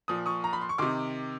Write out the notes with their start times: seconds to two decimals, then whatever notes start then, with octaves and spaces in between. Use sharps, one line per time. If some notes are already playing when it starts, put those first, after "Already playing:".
0.08 A#2 F3 D#6
0.26 C#6 D#6
0.44 A#5
0.53 B5
0.61 C6
0.69 C#6
0.78 C3 D#3 C6 D6